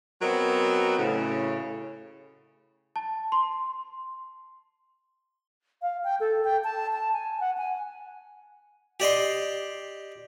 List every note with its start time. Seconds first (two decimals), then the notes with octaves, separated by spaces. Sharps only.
0.21 F#3 B3 C4 F#4 A#4 D#5
0.98 A2 C#3
2.96 A5
3.32 C6
5.82 F5
6.04 G5
6.20 A4
6.44 G5
6.64 A5
6.93 A5
7.13 G#5
7.40 F#5
7.57 G#5
9.00 G4 D5 D#5 C6